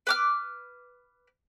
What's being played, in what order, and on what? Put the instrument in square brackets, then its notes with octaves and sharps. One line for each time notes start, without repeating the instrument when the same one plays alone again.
[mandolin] B4 D6 F6